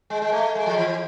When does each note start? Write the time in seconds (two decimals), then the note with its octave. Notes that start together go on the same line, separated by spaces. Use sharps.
0.10 G#3
0.22 G#3
0.32 A3
0.55 G#3
0.66 F3
0.77 E3